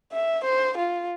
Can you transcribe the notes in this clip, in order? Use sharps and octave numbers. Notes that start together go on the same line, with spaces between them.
E5
C5
F4